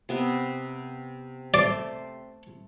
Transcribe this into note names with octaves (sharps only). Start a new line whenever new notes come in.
C3 B3
A3 C5 D5